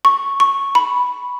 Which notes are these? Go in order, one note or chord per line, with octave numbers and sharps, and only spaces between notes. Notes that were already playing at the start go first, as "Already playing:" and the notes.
C#6
C#6
B5